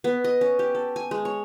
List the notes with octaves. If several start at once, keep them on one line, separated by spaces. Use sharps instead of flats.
B3
D#5
C#4
G4
A4
G#5
G#3
C#5